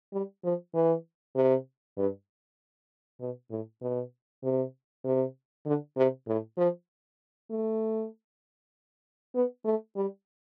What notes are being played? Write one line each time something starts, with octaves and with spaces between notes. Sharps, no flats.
G3
F3
E3
C3
G2
B2
A2
B2
C3
C3
D3
C3
A2
F3
A3
B3
A3
G3